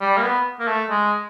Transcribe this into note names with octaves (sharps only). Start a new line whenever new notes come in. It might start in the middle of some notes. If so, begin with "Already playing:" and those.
G3
A#3
B3
A#3
A3
G#3